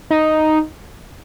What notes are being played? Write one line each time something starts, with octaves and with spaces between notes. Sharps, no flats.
D#4